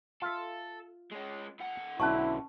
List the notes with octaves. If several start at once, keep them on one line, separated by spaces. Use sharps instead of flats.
F4 A4 E5
G#3 C#4
D#3 F#5
B1 D3 C#4 E4 A5 C#6